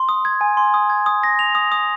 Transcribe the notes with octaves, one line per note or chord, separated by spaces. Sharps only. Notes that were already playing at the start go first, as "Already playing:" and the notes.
Already playing: C6
D#6
G#6
G#5
C6
D#6
G#6
D#6
A#6
F7
D#6
D#6